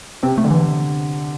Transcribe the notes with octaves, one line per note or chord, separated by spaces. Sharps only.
C3 C4
A3
D3
E3